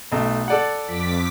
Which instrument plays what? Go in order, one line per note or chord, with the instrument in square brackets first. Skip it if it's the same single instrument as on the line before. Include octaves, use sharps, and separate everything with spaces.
[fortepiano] B1 A3
A4 D5 F#5
[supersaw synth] F2 D6 B6